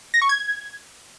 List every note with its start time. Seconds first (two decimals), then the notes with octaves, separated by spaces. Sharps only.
0.14 A#6
0.22 C#6
0.29 G#6